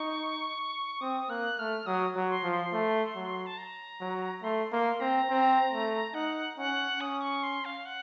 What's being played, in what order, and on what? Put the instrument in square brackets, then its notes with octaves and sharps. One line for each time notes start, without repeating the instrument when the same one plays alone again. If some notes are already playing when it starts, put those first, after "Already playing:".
Already playing: [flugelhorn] D#4 [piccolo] C#6
[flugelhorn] C4 [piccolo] D#6
[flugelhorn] A#3 [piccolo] F#6
[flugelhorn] A3 [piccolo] F6
[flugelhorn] F#3 [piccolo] D#6
[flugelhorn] F#3
[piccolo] C6
[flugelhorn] F3
[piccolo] C6
[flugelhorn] A3
F#3
[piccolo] A5
A#5
[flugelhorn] F#3
[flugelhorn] A3 [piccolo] C6
[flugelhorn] A#3 [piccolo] C6
[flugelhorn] C4 [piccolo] A#5
[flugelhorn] C4
A3
[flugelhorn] D#4 [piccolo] F#5
[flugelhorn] C#4 [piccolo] F#5
[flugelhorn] C#4 [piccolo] D#6
[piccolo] C#6
C6
F5
F#5